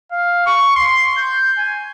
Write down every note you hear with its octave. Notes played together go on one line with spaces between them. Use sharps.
F5
C#6
C6
G6
G#5